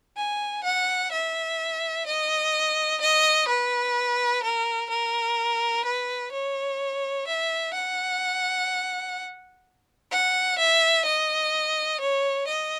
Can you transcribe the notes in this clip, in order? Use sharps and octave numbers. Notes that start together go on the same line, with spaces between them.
G#5
F#5
E5
D#5
D#5
B4
A#4
A#4
B4
C#5
E5
F#5
F#5
E5
D#5
C#5
D#5